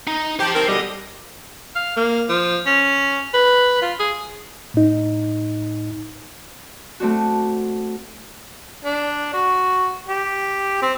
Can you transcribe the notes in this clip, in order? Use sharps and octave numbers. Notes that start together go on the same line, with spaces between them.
D#4
G4 C5 A5
D#3 C4 A#4
B2 D3 G3 D#5
F5
A#3
F3
C#4
B4
F4
G#4
A2 D#4
A3 C4 D4 F#4
D4
F#4
G4
C4